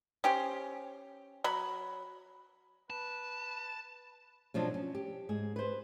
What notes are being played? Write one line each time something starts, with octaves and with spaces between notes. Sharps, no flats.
C#4 G4 C5
F#3 B5
B4 A5
B2 F3 F#3 D4
C#4
G4
G#2 G#4
B4 C5